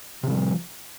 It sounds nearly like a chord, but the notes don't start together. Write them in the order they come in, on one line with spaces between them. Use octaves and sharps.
C3 D#3 G3 F3